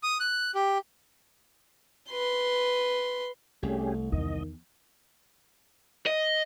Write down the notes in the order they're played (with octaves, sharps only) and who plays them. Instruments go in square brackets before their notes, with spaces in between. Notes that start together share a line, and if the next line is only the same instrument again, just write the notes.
[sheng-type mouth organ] D#6
F#6
G4
[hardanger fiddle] B4 C6
[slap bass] C2 [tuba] A3 [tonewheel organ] C#4 G4 G#4
[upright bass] E2 [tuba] D#3 [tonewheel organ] D#5
[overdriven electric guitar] D#5